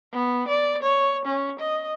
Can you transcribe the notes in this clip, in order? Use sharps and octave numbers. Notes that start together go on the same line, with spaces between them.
B3
D5
C#5
C#4
D#5